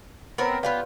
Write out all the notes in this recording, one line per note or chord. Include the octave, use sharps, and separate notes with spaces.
B3 C4 A#4 B4 C#5
B3 F4 G4 B4 D5 F5